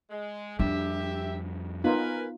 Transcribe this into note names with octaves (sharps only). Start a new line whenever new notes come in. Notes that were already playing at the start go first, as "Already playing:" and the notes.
G#3
F2 G3 D4 G4 E5
B3 D#4 F4 A#4 B4 G#5